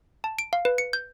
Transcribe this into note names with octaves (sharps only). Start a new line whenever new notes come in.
A5
D7
F5
B4
C#7
G6